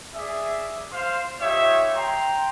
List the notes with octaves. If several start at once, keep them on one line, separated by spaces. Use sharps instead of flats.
G#4 D5 E5
C5 F5 C6
D#4 F4 G4 C#5 E5
G5 A#5 C6